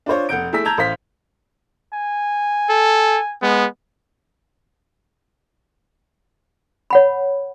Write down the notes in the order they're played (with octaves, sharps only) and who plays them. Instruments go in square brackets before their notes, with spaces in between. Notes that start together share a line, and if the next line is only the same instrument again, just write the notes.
[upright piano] D4 F4 C5 C#5
F1 F#5 G6 D7
A3 E4 G#4 G#5 E6 B6
A5 A#5 E6 G6 G#6 F7
A1 C5 F5 B6
[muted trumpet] G#5
[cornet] A4
[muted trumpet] G#3 [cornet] B3
[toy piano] C#5 F#5 B5